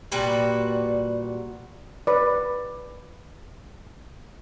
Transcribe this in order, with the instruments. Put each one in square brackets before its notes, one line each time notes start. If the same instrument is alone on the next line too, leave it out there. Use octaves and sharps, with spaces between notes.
[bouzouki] A#2 G3 F#4 B4
[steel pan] B4 D5